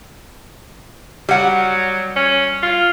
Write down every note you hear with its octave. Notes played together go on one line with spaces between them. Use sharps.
F#3 G3 F#5
C#4
F4